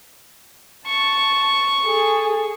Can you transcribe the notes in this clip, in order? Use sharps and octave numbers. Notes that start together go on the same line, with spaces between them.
A5 C#6
G#4 A4